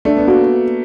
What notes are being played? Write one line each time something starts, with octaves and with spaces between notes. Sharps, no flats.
A3 D4
B3
A#3 F#4